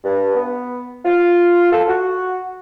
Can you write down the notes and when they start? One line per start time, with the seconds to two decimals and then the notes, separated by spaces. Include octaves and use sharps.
0.04 G2
0.35 B3
1.05 F4
1.72 A4
1.88 F#4